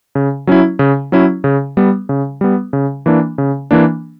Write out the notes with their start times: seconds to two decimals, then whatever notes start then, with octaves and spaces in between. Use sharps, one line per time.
0.15 C#3
0.47 F#3 C#4 E4
0.79 C#3
1.12 F#3 C#4 E4
1.44 C#3
1.77 G3 B3
2.09 C#3
2.41 G3 B3
2.73 C#3
3.06 E3 A#3 D4
3.38 C#3
3.71 E3 A#3 D4